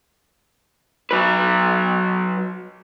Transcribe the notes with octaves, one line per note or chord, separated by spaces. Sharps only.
F#3 B4